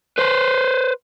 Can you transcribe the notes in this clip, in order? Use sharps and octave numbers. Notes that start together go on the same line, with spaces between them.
B4 C5